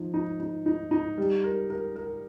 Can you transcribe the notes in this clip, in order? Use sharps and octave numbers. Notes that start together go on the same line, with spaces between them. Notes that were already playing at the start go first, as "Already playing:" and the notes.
Already playing: F3 D#4
D#4
D#4
D#4
D#4
G3
A#4
A#4
A#4